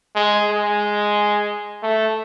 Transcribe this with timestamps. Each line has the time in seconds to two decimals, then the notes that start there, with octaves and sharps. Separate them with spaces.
0.16 G#3
0.50 G#3
1.83 A3